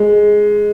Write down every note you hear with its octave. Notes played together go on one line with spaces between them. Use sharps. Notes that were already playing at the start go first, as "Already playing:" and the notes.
Already playing: G#3